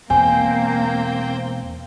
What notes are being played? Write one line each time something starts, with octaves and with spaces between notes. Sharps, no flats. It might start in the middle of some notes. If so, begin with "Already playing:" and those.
E1 E2 A#3 C4 G5 G#5